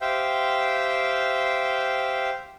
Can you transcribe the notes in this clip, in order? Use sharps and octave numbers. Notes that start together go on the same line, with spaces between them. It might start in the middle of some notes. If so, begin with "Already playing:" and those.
G4 C5 E5 F5 G5